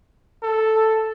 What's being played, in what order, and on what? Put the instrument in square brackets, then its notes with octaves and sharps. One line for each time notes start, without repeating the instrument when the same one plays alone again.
[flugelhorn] A4